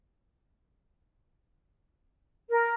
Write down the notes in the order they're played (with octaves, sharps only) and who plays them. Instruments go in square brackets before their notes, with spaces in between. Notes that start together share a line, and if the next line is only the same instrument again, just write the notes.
[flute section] A#4